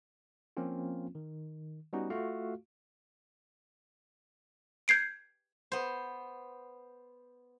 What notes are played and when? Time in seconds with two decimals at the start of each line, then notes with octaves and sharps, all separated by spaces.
0.57 F3 A#3 C4 C#4 F4
1.15 D#3
1.93 G3 B3 C#4 D#4 F#4
2.10 A3 F4 F#4 F5
4.88 G6 G#6 C7 D7
5.72 B3 C5